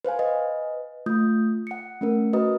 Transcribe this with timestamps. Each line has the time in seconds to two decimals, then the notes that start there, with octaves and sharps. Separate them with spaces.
0.05 B4 C5 F5 G#5
0.19 B4 D#5
1.06 A3 F4 D#6 G6
1.67 F#5 C#7
2.01 A3 C#4 A#4
2.33 F#4 B4 D#5 A#5 D#6